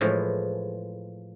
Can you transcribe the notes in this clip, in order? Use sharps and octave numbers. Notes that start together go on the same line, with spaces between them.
A2 E3 F3 G#3